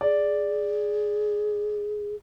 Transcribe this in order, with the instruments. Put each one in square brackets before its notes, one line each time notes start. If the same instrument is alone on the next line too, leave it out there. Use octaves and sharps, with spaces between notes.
[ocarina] G#4 [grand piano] D5